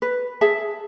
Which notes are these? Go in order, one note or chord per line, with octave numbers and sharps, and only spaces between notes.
B4
G#4 E5 A5